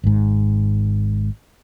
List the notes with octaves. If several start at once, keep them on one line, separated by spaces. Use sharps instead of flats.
G#1 G#2